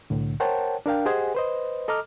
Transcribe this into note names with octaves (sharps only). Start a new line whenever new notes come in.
C2 A2 D3
A#4 C5 C#5 F#5 G5 A5
D4 A#4 F5 G5
G4 G#4 C5 D#5 F#5 G#5
B4 C5 D#5
A4 D#5 A#5 D6 F6